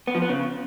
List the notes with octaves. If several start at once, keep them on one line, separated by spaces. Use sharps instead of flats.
B3
F3
B3
C#3